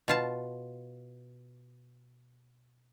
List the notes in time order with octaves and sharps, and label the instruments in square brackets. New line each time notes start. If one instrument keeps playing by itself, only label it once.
[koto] B2 F4 A5